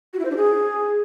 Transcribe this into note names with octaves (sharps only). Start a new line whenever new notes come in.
F#4
E4
C5
D4
G#4